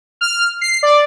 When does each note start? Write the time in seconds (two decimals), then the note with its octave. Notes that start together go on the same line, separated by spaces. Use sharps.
0.21 F6
0.61 C7
0.83 D5